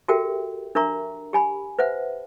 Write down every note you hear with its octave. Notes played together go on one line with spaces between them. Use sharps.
F#4 G4 A4 A#4 E5 G5
D4 A#4 E5 A#5 C#6
G4 G#5 B5
B4 C5 E5 F#5